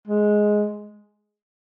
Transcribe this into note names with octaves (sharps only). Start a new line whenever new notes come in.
G#3